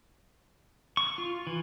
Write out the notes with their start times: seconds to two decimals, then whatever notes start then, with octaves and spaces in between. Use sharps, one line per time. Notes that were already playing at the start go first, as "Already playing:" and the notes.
0.97 C#6
1.18 F4
1.47 E3